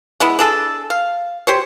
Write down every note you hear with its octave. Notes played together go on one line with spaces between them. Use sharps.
G#3 B3 E4
D4 G#4 A4
F5
G4 C5 C#5